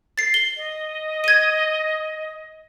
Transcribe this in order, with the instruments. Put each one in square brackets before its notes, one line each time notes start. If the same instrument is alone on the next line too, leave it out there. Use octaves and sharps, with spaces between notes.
[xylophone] A6 C7
G7
[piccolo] D#5
[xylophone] G#6 D#7